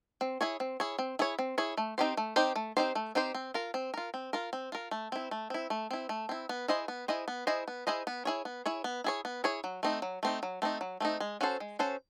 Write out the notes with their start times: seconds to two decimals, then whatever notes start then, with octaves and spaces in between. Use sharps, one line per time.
0.21 C4
0.41 E4 G#4 C#5
0.60 C4
0.80 E4 G#4 C#5
0.99 C4
1.19 E4 G#4 C#5
1.39 C4
1.58 E4 G#4 C#5
1.77 A3
1.98 C4 D#4 G4 C5
2.17 A3
2.36 C4 D#4 G4 C5
2.56 A3
2.77 C4 D#4 G4 C5
2.95 A3
3.15 C4 D#4 G4 C5
3.35 C4
3.54 F4 A#4
3.74 C4
3.94 F4 A#4
4.14 C4
4.33 F4 A#4
4.53 C4
4.72 F4 A#4
4.91 A3
5.12 C4 E4
5.31 A3
5.50 C4 E4
5.70 A3
5.91 C4 E4
6.09 A3
6.29 C4 E4
6.49 B3
6.68 E4 G#4 C5 D#5
6.88 B3
7.08 E4 G#4 C5 D#5
7.28 B3
7.47 E4 G#4 C5 D#5
7.68 B3
7.87 E4 G#4 C5 D#5
8.07 B3
8.25 E4 G#4 C#5
8.45 B3
8.66 E4 G#4 C#5
8.84 B3
9.04 E4 G#4 C#5
9.25 B3
9.44 E4 G#4 C#5
9.64 F#3
9.83 A3 C4 D#4
10.02 F#3
10.23 A3 C4 D#4
10.43 F#3
10.62 A3 C4 D#4
10.81 F#3
11.00 A3 C4 D#4
11.20 G#3
11.41 C#4 F#4 A4 C5
11.60 G#3
11.79 C#4 F#4 A4 C5